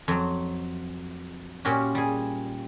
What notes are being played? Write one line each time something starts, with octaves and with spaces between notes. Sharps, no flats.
F2 F#3
A#2 C#4 F#4 G4
G3 G#4